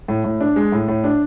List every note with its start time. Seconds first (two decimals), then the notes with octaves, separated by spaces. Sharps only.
0.08 A2
0.24 A2
0.41 D4
0.56 G#3
0.72 A2
0.88 A2
1.04 D4